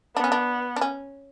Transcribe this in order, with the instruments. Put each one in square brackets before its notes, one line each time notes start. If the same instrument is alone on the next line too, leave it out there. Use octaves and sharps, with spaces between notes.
[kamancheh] B3 [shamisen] D4
[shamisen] C#4
D4
D4
C#4